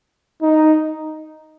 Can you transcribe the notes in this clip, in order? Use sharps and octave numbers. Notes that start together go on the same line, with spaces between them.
D#4